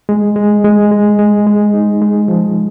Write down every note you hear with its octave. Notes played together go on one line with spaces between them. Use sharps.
G#3
G#3
G#3
G#3
G#3
G#3
D#4
G#3
F3